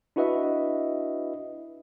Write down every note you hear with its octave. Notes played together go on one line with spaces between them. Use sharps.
D4 E4 F#4 B4 D#5 E5